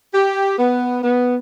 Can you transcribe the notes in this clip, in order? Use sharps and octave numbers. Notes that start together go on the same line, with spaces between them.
G4
B3
B3